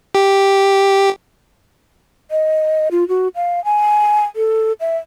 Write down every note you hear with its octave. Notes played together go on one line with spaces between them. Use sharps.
G4
D#5
F4
F#4
F5
G#5
A4
E5